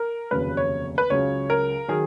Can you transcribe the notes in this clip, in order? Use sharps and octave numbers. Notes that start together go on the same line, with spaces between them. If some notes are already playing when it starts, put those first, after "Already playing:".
Already playing: A#4
F1 D#2 C#3 F#3 B4
C#5
B4
C#2 C#3 F#3 C#5
A#4
D#3 F#3 G#4